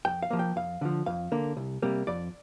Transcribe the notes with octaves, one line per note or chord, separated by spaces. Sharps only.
F2 G5
F5
F3 A#3
G5
F2 F5
D3 F3
F2 F5
D3 A#3
C2
C3 G3 A#3
F2 D5